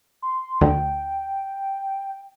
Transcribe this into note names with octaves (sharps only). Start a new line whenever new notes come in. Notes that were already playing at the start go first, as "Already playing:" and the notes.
C6
D2 G5